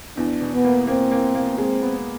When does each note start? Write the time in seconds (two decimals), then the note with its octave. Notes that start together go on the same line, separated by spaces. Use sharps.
0.17 E2 D4
0.41 B2
0.53 B3
0.64 A#3
0.87 A#3 C4
1.12 A#3
1.35 A#3
1.58 G#3 C4
1.82 B3